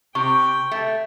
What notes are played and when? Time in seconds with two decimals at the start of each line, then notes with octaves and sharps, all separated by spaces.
0.15 C3 G5 C#6
0.71 A3